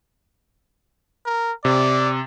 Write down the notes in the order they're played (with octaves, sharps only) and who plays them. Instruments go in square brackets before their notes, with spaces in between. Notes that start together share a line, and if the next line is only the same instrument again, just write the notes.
[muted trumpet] A#4
[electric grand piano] C3 [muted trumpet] D5